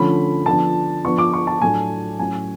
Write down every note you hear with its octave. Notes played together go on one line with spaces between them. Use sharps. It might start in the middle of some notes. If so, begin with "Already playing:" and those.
Already playing: D3 F3 A3 C#4 B5
D3 F3 B3 D4 A5
F3 B3 D4 C#6
D6
C#6
A5
A2 F#3 A3 D4 G#5
A2 F#3 C#4 G#5